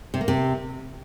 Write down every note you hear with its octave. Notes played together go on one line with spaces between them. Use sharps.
C3
A#3
C3